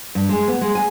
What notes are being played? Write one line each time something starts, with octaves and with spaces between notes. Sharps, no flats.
G2
G#3
B3
G#3
G#5